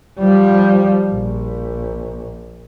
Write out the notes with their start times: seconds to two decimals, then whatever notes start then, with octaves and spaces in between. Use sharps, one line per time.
0.18 F3 G3
1.10 A#1